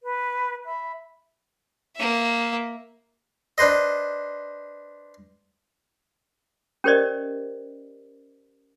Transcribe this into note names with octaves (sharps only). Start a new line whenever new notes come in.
B4
E5 B5
A#3 E5
D4 B4 C5 D#5
C#4 G4 A#4 C5 D5 D#5